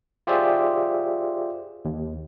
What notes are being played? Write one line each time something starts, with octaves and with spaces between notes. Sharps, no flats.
F4 G4 G#4 C5 D5 E5
D#2